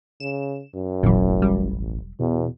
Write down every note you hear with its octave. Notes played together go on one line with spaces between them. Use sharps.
C#3 E7
F#2
E1 A1 A#2 E3 F#3
G3
E2 B2